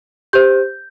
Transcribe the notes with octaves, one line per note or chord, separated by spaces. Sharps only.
G4 C5 G6